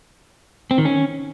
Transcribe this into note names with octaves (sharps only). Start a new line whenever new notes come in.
C4
D#3
C#4